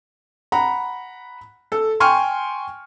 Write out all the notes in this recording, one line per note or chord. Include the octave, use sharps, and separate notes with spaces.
F#5 A#5 B5
A4
G5 G#5 C6 C#6 F6